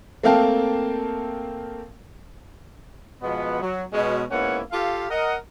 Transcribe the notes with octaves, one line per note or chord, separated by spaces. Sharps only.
A3 A#3 C4 F5 G5 A5
B2 F3 G#3 B3
F#3
B2 G#3 C#4
G#2 A#3 B3 C#4 E4 F#5
F4 G4 A4 F5
A#4 D#5 F#5